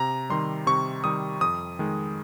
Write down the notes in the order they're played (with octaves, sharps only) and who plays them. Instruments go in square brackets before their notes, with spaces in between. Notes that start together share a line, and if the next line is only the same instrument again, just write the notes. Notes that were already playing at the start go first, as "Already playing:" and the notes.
Already playing: [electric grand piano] C3 A#5
D#3 G3 C6
C3 C#6
D#3 G3 D#6
F2 D#6
D#3 G#3